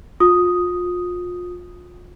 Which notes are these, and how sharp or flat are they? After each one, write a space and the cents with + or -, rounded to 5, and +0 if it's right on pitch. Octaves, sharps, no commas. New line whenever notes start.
F4 +30 D#6 +0